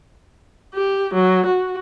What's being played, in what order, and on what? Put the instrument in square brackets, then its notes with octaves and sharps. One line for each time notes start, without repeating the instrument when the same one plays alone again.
[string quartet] G4
F#3
F#4